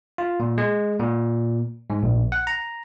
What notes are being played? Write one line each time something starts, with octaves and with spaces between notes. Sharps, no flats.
F4
A#2
G#3
A#2
G#2
A#1
F#5
A#5